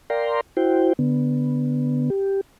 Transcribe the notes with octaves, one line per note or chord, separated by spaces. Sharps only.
A#4 D5 F5 G5 A#5 C6
E4 F#4 C5 G5
D3 B3
G4